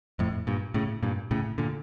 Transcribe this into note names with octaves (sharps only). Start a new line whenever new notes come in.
F2 A2
G2 A#2
A2 C#3
G2 A#2
A2 C#3
A#2 D3